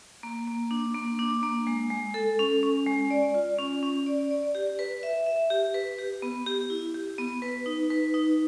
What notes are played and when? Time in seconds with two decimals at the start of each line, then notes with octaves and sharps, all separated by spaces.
0.23 A#3
0.47 A#3
0.71 D4
0.95 A#3
1.19 D4
1.43 A#3
1.67 G#3
1.91 G#3
2.14 A4
2.39 C#4
2.63 C#4
2.87 G#3
3.10 D5
3.34 F4
3.59 C#4
3.83 C#4
4.06 D5
4.31 D5
4.55 G4
4.79 B4
5.03 E5
5.26 E5
5.50 G4
5.74 B4
5.99 G4
6.22 B3
6.47 G4
6.70 E4
6.94 G4
7.18 B3
7.42 B4
7.66 D#4
7.90 B4
8.14 D#4